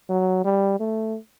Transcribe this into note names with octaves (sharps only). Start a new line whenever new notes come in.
F#3
G3
A3